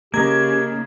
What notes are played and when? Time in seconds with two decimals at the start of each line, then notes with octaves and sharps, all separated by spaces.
0.14 C#3 A#3 D#4 G4 A#4 G#6